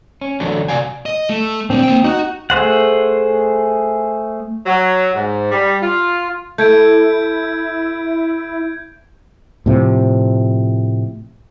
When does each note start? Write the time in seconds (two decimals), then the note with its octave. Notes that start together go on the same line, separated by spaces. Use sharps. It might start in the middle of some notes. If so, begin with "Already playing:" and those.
0.21 C#4
0.40 F2 D3 E3 F#3 A3 D4
0.68 C3 F#4 D5 F5 G#5
1.06 D#5
1.30 A3
1.70 A#2 C4 D4
1.83 A#3 G5
2.04 D#4 F#4 F#5
2.50 A3 G#4 C5 F#5
4.66 F#3
5.14 G#2
5.52 G3
5.82 F4
6.58 A3 E4 G6 G#6 D7
9.66 A2 C3 F3